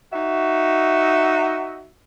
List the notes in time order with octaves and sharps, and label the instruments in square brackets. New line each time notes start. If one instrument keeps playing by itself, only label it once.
[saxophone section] D#4 F#4 E5